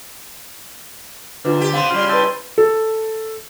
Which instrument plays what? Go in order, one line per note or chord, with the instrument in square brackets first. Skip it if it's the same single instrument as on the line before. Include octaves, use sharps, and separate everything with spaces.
[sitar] G#2 [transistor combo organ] D3 [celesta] D4 F4 B4
[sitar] G4
[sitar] B3 C4 [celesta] F5 C6
[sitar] C#3 G3 [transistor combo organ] F4 [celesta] C6
[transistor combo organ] E4 G5 A5 [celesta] B4 C6 D#7
[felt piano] A4